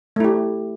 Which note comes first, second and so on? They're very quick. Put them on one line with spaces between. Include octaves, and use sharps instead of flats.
A3 E4 G4